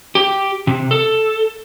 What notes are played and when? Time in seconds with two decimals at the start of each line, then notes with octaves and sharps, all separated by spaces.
0.15 G4
0.67 C3
0.91 A4